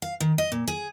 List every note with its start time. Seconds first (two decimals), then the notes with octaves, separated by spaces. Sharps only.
0.02 F5
0.20 D#3
0.38 D#5
0.52 A#2
0.67 G#4